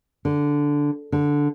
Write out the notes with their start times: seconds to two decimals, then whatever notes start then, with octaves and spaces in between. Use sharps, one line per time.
0.25 D3
1.12 D3